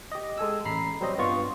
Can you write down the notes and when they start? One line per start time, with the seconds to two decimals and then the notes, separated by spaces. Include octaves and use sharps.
0.12 G4 D#5
0.38 G#3 A4 G#5 E6
0.65 A1 A#5 B5 C7
1.01 F#3 G3 C4 C5 D#5
1.18 G2 B3 F4 C#6